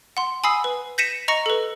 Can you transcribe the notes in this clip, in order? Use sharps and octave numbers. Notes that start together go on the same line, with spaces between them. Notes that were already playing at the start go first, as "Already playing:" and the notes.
F#5 C6
G#5 B5 D#6 E6 C7
B4
G6 A#6 B6 C#7 D#7 E7
D#5 A#5 C#6 A#6 C#7
A4 B4